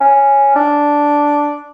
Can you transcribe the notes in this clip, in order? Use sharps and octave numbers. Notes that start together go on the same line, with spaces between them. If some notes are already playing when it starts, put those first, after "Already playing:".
C#4
D4